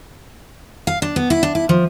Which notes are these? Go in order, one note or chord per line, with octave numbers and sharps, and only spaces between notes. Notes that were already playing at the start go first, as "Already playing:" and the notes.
F5
D4
B3
E4
D4
E4
F3